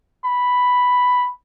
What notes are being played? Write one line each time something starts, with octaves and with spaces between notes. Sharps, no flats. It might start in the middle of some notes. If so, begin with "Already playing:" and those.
B5